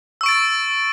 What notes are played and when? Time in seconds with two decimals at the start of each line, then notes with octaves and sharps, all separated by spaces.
0.21 E6
0.23 C#6
0.26 D7
0.29 A6